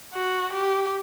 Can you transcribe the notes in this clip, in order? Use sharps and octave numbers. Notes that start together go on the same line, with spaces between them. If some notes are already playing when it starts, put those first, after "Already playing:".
F#4
G4